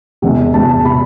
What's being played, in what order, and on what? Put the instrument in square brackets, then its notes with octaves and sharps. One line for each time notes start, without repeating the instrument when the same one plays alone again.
[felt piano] E1 E2 C3 F#5
E1 E2 C3 A5
A5
C3 B5